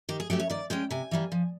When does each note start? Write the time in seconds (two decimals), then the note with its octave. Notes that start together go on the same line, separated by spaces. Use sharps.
0.09 D#3 G4
0.20 G#4
0.30 F#3 A3 C#4 G4
0.40 C#5
0.50 D#3 D5
0.70 G#3 C#4 G5
0.90 C3 G#5
1.11 E3 G3 A#3
1.32 F3